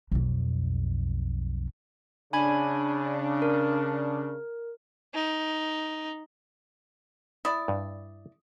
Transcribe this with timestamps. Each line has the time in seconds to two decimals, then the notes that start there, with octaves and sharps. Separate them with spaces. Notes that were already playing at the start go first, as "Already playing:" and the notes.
0.12 B1 F2
2.33 C#3 D4 G#5 B5 G#6
3.42 A#4
5.14 D#4
7.45 E4 D5 D#6
7.68 G2